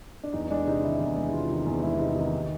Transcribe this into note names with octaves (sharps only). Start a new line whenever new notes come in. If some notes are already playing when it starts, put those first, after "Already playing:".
D4
E2 D#4
G#3 D4
C3 D#4
D#3 E4
E2
G#3
E4
C3 F4
D#3
E2
G#3 E4
C3 D#4
D#3 D#4
D#2